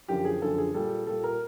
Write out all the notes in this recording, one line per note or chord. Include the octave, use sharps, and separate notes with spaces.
F#2 D3 F3 G4
G#4
F#2 D3 F3 A4
G#4
A#2 G3 A4
A#2 G3 A4
A#4